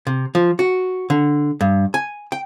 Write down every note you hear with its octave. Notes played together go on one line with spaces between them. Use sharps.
C3
F3
F#4
D3
G2
G#5
G5